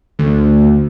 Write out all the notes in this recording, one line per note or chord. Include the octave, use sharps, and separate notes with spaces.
D2